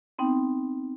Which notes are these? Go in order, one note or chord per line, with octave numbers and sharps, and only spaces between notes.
B3 C4 D#4 G5